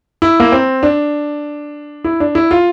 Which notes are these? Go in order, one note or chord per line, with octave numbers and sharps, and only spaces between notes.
E4
A#3
C4
D4
E4
D4
E4
F4